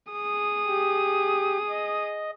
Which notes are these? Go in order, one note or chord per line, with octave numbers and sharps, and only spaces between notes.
G#4 D#6
G4
D#5